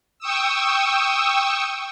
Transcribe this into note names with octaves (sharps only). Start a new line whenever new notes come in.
G5 C#6 D#6 E6